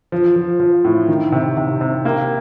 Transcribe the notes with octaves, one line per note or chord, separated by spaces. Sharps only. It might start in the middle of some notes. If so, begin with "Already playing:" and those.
F3
F3
F3
A2
D#3
C3
C3
C3
A#3